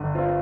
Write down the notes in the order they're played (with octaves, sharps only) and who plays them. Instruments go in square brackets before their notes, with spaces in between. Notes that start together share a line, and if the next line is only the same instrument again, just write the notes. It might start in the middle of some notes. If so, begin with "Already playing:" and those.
Already playing: [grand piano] G1 G2 D3
C4 F4